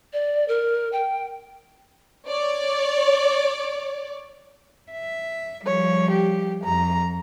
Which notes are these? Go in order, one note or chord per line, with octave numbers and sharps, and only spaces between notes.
D5
A#4
G5
C#5 D5
E5
F3 G3 C#5
G4
F2 A#5